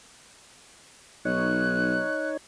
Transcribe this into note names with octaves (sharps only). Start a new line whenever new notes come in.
B1 D#4 C#5 F#6